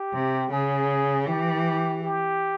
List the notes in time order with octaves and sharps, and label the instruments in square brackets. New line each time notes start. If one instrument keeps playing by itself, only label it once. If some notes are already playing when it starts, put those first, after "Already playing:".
Already playing: [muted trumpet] G4
[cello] C3
[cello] C#3 [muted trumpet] G#4
[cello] E3 [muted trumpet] G4
[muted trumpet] G4